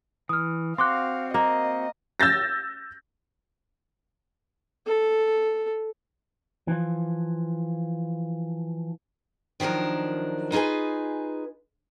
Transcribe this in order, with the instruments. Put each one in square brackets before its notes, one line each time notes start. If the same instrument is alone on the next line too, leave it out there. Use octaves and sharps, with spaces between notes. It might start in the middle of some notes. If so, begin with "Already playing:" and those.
[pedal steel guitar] E3 [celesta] D#6 F6
[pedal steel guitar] C4 F#4 [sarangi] F5 [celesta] C6 D6 F#6
[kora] A#3 [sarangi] D#5
[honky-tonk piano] E6 G6 A6 A#6
[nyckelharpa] A4
[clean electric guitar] E3 F3
[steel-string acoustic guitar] D#3 F3 F#3 D4 A#4
D#4 F4 G#4 B4 G#5